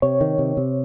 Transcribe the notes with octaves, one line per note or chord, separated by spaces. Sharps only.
C3 C#5
D#3
C3
C3